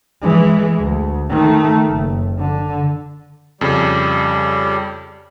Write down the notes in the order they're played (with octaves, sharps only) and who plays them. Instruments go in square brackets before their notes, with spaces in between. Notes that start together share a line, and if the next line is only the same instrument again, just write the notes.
[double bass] E3 G#3
D2
D#3 A3
F#1
D3
[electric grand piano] F2 C#3 [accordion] G3